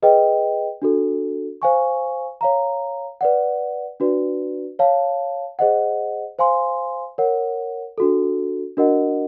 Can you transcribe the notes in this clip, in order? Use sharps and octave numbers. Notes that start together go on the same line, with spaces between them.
G#4 B4 D#5 G5
D4 F#4 A4
C5 F5 G#5 C#6
C#5 F5 A#5
B4 D5 F#5
D4 F#4 B4 D5
C#5 F5 A5
G#4 C5 D#5 F#5
C5 F5 G#5 C6
A#4 C#5 F#5
D4 F#4 A4
D4 F#4 A#4 D#5 F#5